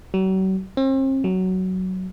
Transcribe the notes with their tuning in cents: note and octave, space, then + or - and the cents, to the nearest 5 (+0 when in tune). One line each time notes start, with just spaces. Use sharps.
F#3 +40
C4 +40
F#3 +10